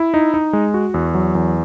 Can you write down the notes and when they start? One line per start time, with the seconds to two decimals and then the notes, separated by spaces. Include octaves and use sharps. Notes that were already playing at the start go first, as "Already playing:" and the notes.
Already playing: E4
0.14 D#4
0.34 D#4
0.53 G#3
0.74 F#4
0.94 E2
1.15 F#3
1.35 E2